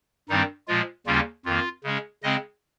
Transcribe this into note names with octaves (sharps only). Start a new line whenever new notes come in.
G2 D#3 G3 C4 D#4
A#2 F3 G#3 F4
D#2 C#3 G3 A#3 C#4 F4
F2 D#3 A#3 F4
C#3 G#3 C#4
C#3 G#3 C4 D#5